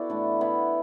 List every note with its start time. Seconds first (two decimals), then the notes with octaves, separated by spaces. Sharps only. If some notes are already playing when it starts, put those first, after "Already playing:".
Already playing: B3 E4 F#4 A4 D5
0.10 A2 E3 A3 D4
0.41 B3 E4